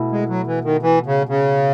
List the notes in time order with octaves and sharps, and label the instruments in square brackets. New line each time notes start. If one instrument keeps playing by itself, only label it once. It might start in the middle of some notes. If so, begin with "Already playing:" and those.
Already playing: [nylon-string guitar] B2 A3 E4
[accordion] G#3
F#3
E3
D#3
E3
C#3
C#3